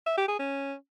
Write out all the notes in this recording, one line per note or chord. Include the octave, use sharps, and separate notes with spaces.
E5
G4
G#4
C#4